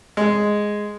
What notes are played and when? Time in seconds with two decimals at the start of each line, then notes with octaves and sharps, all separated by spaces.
0.17 G#3